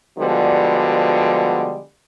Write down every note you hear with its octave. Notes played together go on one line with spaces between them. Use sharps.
B2 D3 F3 G3 G#3